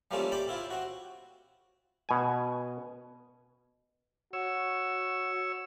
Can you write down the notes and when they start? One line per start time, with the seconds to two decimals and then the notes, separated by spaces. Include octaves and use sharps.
0.11 G3 A3 A#3 C4 C#4 F4
0.32 G4 D5 B5 D6
0.48 C4 E4 F4
0.70 C4 F#4
2.09 B2 G#5
4.33 F#4 C#5 E6